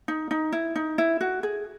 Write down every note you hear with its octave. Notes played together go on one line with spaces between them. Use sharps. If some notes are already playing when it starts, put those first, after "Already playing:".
D#4
D#4
E4
D#4
E4
F#4
G#4